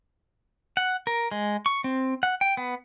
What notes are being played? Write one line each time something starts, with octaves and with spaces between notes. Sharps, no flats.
F#5
A#4
G#3
C#6
C4
F#5
G5
B3